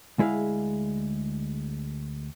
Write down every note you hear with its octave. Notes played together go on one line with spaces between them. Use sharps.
D2 G#3 E4 G#4 F5